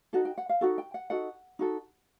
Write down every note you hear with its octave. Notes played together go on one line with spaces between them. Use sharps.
D#4 F#4 A4
G5
F#5
F5
D#4 F#4 A4 F#5
G5
F#5
D#4 F#4 A4 F#5
D#4 F#4 A4